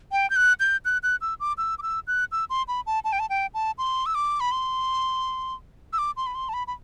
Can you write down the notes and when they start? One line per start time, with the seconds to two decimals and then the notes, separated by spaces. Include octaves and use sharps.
0.12 G5
0.30 G6
0.36 F#6
0.60 G6
0.85 F#6
1.03 F#6
1.21 E6
1.40 D6
1.58 E6
1.79 D6
1.83 E6
2.07 F#6
2.32 E6
2.50 C6
2.68 B5
2.87 A5
3.04 A5
3.13 G5
3.19 A5
3.30 G5
3.54 A5
3.78 C6
4.06 E6
4.15 D6
4.40 B5
4.52 C6
5.93 E6
5.98 D6
6.17 C6
6.27 B5
6.35 C6
6.49 A5
6.54 B5
6.67 B5